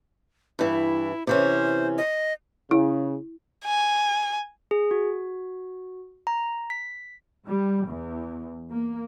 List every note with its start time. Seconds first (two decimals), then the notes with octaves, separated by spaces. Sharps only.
0.59 G2 E3 E4
1.27 C3 E3 C#4 C5
1.98 D#5
2.71 C#3 E4
3.65 G#5
4.71 G#4
4.91 F#4
6.27 A#5
6.70 B6
7.47 G3
7.86 E2
8.69 A#3